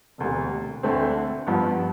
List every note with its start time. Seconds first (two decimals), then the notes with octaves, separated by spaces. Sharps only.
0.18 E1 D2 C3
0.83 D2 D3 A3 C4
1.47 G2 F3 B3